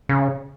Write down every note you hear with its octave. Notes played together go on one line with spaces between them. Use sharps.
C#3